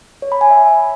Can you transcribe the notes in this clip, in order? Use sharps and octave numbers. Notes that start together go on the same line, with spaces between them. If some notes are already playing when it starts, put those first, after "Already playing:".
C#5
B5
G#5
E5